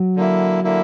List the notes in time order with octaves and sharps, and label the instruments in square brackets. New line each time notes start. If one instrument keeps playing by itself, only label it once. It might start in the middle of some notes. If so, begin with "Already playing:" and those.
Already playing: [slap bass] F#3
[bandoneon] D3 A#3 E4
D3 A#3 E4